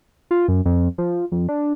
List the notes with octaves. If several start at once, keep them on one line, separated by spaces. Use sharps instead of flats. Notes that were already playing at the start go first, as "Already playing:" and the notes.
F4
F#2
F2
F3
F2
D4